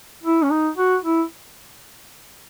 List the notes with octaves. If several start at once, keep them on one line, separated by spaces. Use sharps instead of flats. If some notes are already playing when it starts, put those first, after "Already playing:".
E4
C#4
D#4
F#4
E4